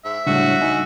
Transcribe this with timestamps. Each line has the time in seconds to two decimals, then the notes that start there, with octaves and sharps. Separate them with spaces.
0.05 G#2 E5
0.27 C#2 A2 G3 D4 F#4
0.62 D#4 G#5